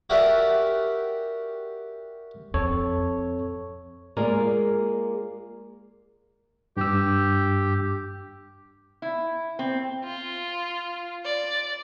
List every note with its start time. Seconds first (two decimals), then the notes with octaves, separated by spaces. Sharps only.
0.10 F#4 G4 A#4 D5 E5 F#5
2.54 F2 C4 A4 C#5
4.17 G#3 A#3 F4 G#4 A#4 D5
6.77 G2 G4 E6
9.02 E4
9.59 C4
10.04 F4
11.25 D5